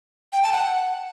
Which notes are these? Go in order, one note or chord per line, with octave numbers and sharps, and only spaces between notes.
G5
A5
F#5